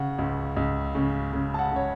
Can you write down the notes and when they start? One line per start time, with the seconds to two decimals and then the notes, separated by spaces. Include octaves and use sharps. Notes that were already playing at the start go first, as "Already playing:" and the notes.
Already playing: C#3 F#5
0.18 C#2
0.56 C#2
0.95 C#3
1.33 C#3
1.54 A5
1.59 F#5
1.72 C#3 C#5